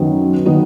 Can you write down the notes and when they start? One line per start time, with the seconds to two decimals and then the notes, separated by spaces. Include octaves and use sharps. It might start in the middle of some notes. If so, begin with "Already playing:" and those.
Already playing: F#2 D#3 F#3 B3 D#4
0.46 D#3 F#3 B3 D#4